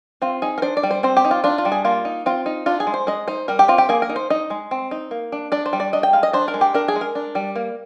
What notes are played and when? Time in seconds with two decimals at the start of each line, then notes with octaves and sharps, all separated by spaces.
0.22 C4 F4
0.42 D#4 G#4
0.58 A#4
0.62 D4 C5
0.77 D5
0.83 G3
0.91 C5
1.03 C4 C5
1.17 G4
1.25 D#4
1.31 F4
1.44 D4 F4
1.58 F4
1.65 G3
1.72 G#4
1.85 A#3 F4
2.05 D#4
2.26 C4 F4
2.46 D#4
2.66 D4 F4
2.80 G#4
2.87 G#3
2.94 C5
3.07 G#3 D#5
3.28 D#4 C5
3.48 G3 A#4
3.59 G4
3.68 C4 F4
3.78 G4
3.89 A#3 G#4
4.02 A#4
4.10 D#4
4.16 C5
4.30 D#4 D#5
4.50 G#3
4.71 C4
4.91 D#4
5.11 A#3
5.32 D4
5.52 D4 D5
5.66 C5
5.73 G3
5.80 D5
5.93 D4 D#5
6.03 G5
6.13 G#3 F5
6.23 D#5
6.33 D4 C5
6.48 A#4
6.54 G#3
6.61 G4
6.74 D4 A#4
6.88 G#4
6.96 G#3
7.01 A#4
7.15 D4
7.35 G3
7.56 A#3